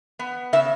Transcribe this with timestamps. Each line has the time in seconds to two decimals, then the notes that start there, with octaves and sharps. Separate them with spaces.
0.19 B3
0.53 C#3 E5